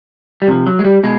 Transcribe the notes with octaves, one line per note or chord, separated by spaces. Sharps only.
G3
C3 F3 F#3
F#3
G#3
G3
B2 G#3